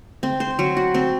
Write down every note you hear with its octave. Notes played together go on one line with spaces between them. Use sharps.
C4
C5
F#3
F#4
C4